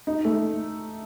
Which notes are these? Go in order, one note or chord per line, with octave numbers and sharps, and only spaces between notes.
D#4
A3